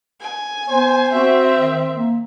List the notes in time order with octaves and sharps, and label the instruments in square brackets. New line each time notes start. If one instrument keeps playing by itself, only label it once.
[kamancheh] G#5
[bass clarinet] B3 [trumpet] C5
[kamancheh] C4 E5 [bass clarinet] F#4
[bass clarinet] D#3
A#3